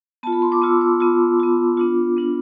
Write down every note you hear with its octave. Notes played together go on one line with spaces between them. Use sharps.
B3 F4 A5
B5
C6
D6
B3 F4 E6
D6
B3 F4 D6
B3 F4
B3 D4 F4
B3 D4 F4